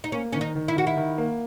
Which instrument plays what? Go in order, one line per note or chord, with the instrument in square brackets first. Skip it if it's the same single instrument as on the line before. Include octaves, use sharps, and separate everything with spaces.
[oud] D#4
[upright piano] A#3 [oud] C#4
[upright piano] D#3 [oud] C#4
[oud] D#4
[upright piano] D#3
[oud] E4
[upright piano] D#3 [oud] F#4
[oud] E4
[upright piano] D#3
A#3